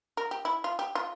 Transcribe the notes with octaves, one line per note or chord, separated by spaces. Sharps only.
A#4
G4
E4
F4
G4
F4